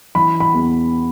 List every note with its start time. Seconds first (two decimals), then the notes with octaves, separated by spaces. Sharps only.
0.15 E3 B5
0.40 B5
0.54 E2